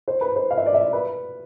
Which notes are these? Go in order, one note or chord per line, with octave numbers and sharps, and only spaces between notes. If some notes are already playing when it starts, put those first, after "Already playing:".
C5
B4
C5
F5
E5
D5
E5
B4